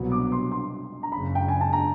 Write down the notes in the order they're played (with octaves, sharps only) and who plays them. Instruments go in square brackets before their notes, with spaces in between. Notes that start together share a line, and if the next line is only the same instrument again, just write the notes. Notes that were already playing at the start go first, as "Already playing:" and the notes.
Already playing: [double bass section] C2 B2 F#3 B3
[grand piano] D6
C6
C6
A#5
[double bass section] F#1 F#2 C#3 [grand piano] B5
[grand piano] G5
G#5
A5
A#5